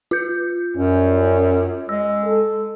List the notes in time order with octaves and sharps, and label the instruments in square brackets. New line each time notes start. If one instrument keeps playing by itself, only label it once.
[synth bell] F4 G6
[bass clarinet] F#2 [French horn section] F#3 G3 C#4
[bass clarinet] G#3 [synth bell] E6
[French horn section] A4